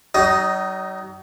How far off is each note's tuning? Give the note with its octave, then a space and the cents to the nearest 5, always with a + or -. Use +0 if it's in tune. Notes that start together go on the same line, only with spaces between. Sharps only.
F#3 +45 D#4 +0 D#5 +5